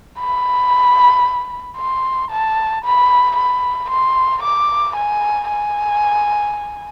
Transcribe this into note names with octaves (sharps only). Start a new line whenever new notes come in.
B5
C6
A5
B5
B5
C6
D6
G#5
G#5